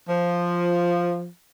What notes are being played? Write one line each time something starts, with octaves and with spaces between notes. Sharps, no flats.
F3